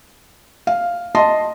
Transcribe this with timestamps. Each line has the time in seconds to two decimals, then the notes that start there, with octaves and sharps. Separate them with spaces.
0.67 F5
1.15 D#5 A5 C6